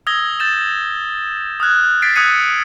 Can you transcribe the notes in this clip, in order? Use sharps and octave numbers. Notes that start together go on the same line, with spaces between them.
D#6 E6 G#6 A#6 G7
G6 A6 E7
D#6 F6 F#6 G#6
G#6 A6 B6 C7 D7
D#6 E6 F#6 G#6 C#7 D#7